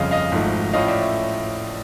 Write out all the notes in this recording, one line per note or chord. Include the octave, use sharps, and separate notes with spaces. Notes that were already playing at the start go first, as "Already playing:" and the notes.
Already playing: G1 F2 C#3 D#5 F5
D#5 F5
G#1 G#2 F3 A3
A2 F3 A3 C#4 D#5 F5
D5 E5
E5